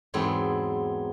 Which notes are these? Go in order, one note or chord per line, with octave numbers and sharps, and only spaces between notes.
E2 G#2 F#3 B3 C4